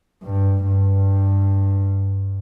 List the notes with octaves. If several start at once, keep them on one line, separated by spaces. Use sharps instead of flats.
G2
G2